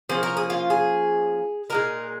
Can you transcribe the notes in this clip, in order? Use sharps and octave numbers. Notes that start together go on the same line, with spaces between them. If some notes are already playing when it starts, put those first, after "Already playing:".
F3 A#3 C#4 G#4
A#4
G#4
F4
G#4
A#2 G#3 D#4 A#4